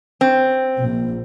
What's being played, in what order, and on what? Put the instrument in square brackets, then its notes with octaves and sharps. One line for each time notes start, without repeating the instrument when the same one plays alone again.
[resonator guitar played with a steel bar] C4
[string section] A#1